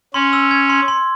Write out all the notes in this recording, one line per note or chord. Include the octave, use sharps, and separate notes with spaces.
C#4 C6
E6
G#6
C6
C6